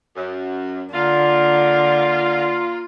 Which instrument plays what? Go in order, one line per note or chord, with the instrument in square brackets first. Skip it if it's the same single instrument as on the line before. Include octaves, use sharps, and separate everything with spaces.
[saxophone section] F#2
[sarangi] D3 [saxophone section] A#3 F4